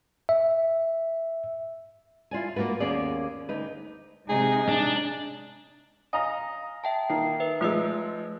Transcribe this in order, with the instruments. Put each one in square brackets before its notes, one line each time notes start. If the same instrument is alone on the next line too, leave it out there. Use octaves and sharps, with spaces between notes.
[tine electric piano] E5
[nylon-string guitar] E4 F4 D5 G#5
A#3 C4 F4 F#4 B4
D#2 A#3 B3 C#4 G#4 D5
D2 D#4 B4
[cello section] C3 G#3 D#4 [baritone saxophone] G#4
[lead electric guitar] D4
[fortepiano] D#5 F5 A#5 [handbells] G#5
[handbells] E5 G5 A5
[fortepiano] D#3 A#3 [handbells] C7
[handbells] B4 E5
[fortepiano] F3 G#3 [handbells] A3 B4 E6